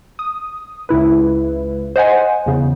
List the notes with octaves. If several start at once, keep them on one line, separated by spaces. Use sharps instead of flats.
D#6
C#2 C#3 E4 B4
C5 D#5 F#5 G#5
E2 C#3